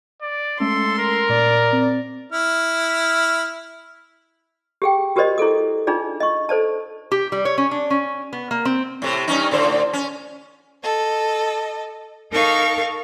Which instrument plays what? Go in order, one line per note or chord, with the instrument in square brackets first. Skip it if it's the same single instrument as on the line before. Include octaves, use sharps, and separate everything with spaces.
[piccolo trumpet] D5
[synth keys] G#3 A3 C#4 [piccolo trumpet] A4 [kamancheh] C6
[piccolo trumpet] A#4
[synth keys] A#2 [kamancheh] D5
[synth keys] C4
[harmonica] E4 F6
[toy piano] G4 G#4 G5
F#4 G4 A#4 C5 D5 D#5
E4 G#4 A4 D#6
D4 D#4 F4 G#4 D5
D#5 C#6
A4 C5 D5 A5
[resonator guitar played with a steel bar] G4
G3
C#5
C#4
D4
C#4
B3
A#3
C4
[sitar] A2 C3
G2 C#4 D#4
A2 D3 C5
C#4
[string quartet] A4 D#5
D#4 A4 A#4 F5 C#6